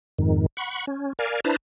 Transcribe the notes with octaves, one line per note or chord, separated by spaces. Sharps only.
F2 G#2 D#3
F#5 B5 C#6
C#4
A#4 D5 F5 G#5
D4 E4 B4 C5 A5 A#5